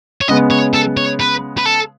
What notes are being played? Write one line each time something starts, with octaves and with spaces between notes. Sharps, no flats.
C#5
C#3 G#3 B3 D#5
C#5
A4
C#5
B4
B4
A4